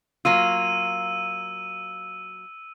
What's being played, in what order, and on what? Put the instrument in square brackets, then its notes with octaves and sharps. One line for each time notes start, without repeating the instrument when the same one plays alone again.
[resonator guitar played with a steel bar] F#3 A#3 F4 [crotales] E6 D#7